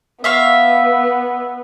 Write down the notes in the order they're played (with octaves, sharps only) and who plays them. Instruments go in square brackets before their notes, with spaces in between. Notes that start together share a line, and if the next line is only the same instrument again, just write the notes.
[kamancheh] B3 [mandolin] E5 F5 C#6